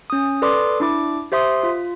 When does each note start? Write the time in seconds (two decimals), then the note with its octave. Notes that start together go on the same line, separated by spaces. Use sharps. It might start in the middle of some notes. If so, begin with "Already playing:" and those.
0.10 C#4 D#6
0.42 A4 B4 D5 C6 D6 D#6
0.80 D4 E4 D6
1.32 G4 C5 E5 C6 D#6
1.63 F4